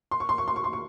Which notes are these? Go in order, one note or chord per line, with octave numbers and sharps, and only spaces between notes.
C6
C#6
C6
C#6
C6
C#6
C6
C#6